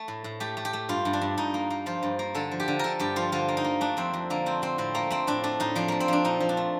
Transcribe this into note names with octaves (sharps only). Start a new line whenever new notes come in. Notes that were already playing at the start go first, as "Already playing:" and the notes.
Already playing: A3
A2
A2
A3 G4
A3
G4
A3
G2 F4
G2
D4
G2
G2 D#4
A#3
A#3
F3 F4
G2
A#3
D3 A4
F3
G4
D3
D3 A4 A#4
G2 G4
F3 F4
D3 F4
A#3
D#4
A#3
A3 D4
F2 C4
F2
D3 A#3
A3 C4
D3 C4
A2 C4
A3 A#3
A3 C4
A2 D4
A3 D4
A2 D#4
F3 D4
A3 A#3
C4
F3 D4
A#2 D#4
F3
D4
A3